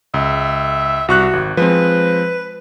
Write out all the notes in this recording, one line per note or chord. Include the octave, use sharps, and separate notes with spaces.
C#2 E5
C2 F#4 C#6 F#6
G#1
F3 G#3 C4 B4